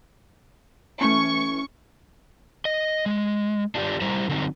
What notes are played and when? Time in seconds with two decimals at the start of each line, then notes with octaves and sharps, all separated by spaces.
1.01 E3 A3 C#4 C#6
2.65 D#5
3.06 G#3
3.75 D4 F4 G4 B4 D5
4.01 G3 E4 C5 A#5
4.29 D3 F#3 C4 D#4